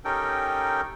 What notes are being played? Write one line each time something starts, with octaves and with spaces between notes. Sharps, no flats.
C#4 D#4 G4 A4 A#4 G5